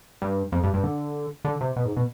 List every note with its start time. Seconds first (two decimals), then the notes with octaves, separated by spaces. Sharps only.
0.22 G2
0.52 F2
0.64 G2
0.74 G2
0.83 D3
1.45 D3
1.61 C3
1.76 B2
1.86 G#2
1.97 B2